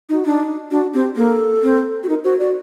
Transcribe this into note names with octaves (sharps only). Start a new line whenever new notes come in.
D#4
F#4
D4 D#4
D4 F#4
C4 G4
A#3 A4
C4
F#4
D#4 A#4
F#4 C5
F#4 D5